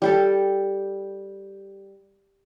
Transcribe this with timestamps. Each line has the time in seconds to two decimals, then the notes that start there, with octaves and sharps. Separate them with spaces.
0.02 G3 G4 A4